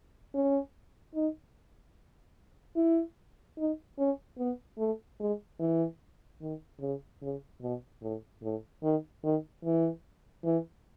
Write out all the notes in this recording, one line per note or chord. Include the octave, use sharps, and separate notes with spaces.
C#4
D#4
E4
D#4
C#4
B3
A3
G#3
E3
D#3
C#3
C#3
B2
A2
A2
D#3
D#3
E3
E3